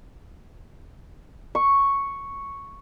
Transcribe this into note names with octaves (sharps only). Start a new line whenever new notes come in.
C#6